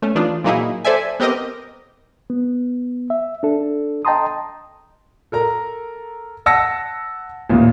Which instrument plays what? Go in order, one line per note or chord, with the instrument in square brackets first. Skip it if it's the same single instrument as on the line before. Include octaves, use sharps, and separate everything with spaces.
[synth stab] A3 C#4
E3 D4 D#4 F4
A#2 F#3 A#3 D#4 E4 G#4
A4 C5 D5 E5 G#5
B3 C4 G4 A#4 D#5
[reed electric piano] B3
E5
D4 A4
D#5 G5 A5 A#5 C6 D#6
[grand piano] A4 A#4 A#5
F#5 A5 E6 A#6 C#7
A1 D#2 A#2